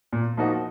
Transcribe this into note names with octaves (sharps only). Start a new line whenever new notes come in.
A#2
F3 A#3 D#4 F#4